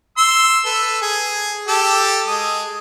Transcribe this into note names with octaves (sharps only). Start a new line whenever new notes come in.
C6 E6
A4 B4
G#4
G4 A4 A5
G#3 D#6